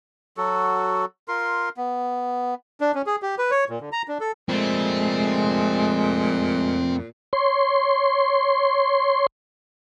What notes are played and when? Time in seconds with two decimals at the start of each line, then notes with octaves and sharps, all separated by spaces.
0.37 F#3 F#4 A4
1.28 F4 A#4 C6
1.77 B3
2.81 D4
2.95 C#4
3.06 G#4
3.22 G4
3.39 B4
3.51 C#5
3.69 A#2
3.81 D3
3.92 A#5
4.08 D4
4.21 A4
4.49 F2 A#2 G#3 A3 C4
7.33 C#5 C6